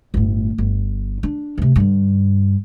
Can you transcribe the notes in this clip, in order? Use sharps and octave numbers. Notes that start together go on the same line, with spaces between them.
G1 A2
G1
D4
D2 C3
G2 D3